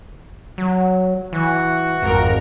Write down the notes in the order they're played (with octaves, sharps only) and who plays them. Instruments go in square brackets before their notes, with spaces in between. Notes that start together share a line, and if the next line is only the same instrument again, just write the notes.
[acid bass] F#3
[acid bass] E3 [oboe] F#4
[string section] G#1 A#4 [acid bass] F2